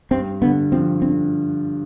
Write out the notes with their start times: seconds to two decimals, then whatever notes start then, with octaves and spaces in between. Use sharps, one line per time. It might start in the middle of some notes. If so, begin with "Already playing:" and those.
0.11 G2 C4
0.41 D3 B3
0.72 F3 C4
1.02 D3 C4